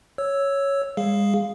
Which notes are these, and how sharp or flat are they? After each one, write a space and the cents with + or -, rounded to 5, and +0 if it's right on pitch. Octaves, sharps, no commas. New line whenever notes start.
C#5 +0 E6 +0
G#3 -40 G#4 +0 F5 +0